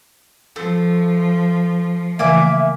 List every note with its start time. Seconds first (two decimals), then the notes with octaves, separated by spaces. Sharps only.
0.56 F3 A3
2.19 C#3 E3 A3 A#3 E5 G#5 D6